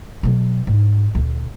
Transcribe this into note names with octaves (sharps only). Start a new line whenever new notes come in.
B2 F#3
G#2
D2 A#2